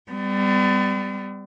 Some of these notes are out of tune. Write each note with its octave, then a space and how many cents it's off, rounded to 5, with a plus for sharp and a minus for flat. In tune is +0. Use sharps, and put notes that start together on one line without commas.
G3 +15 B3 +45